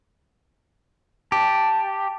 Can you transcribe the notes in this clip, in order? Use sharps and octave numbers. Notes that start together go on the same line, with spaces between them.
G4 A5